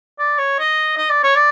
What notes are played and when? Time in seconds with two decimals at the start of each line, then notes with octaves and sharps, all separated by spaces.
0.19 D5
0.38 C#5
0.59 D#5
0.97 D#5
1.10 D5
1.23 C#5
1.36 D5